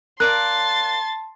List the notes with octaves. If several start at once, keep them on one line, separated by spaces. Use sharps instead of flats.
A#4 D5 F5 A5 C6 F#6 A6